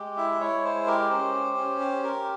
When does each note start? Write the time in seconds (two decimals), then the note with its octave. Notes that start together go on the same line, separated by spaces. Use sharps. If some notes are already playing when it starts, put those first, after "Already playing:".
Already playing: G#3 G4
0.17 E4 E5
0.41 E4 C#5
0.64 G#3 C5
0.87 G4 A#4
1.10 C#4 C5
1.34 G4
1.57 C#4
1.80 G4
2.04 G4 A#4